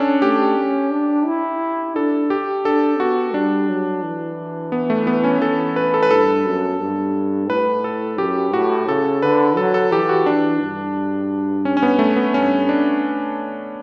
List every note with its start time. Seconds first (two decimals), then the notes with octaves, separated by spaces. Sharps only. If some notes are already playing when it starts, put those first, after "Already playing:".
Already playing: C#4 D4 A4
0.22 A3 G4
0.58 C#4
0.92 D4
1.26 E4
1.96 D4 A4
2.30 G4
2.65 D4 A4
3.00 B3 F#4
3.34 G3 D4
3.69 F#3
4.03 E3
4.72 B3
4.90 A3
5.07 B3
5.24 C#4
5.42 E3 A4
5.76 B4
5.94 A4
6.03 B4
6.11 G2 A4
6.46 F#2
6.80 G2
7.50 A2 B4
7.84 A4
8.18 F#2 G4
8.53 A2 F#4
8.88 C#3 A4
9.22 D3 B4
9.57 F#3 A4
9.74 A4
9.92 E3 G4
10.09 F#4
10.26 E3 D4
10.61 G2
11.65 C#4
11.77 C#4
11.83 B3
11.99 A3
12.16 B3
12.34 G2 C#4
12.69 D4